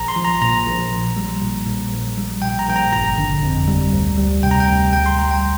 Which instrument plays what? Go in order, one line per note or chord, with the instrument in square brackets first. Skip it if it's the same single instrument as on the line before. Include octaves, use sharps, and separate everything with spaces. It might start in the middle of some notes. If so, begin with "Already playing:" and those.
Already playing: [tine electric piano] A#1 A#5
C6
F3
A#5
A#2 A#5
A#1
A#1
G3
A#2
A#1
A#1
G3
A#2 G5
A#5
A#1 G5
A#5
G1 A#5
D3
F2
G3
D2
G3
C3 G5
A#5
G5
D2
A#1 G5
C6
G3 A#5
G5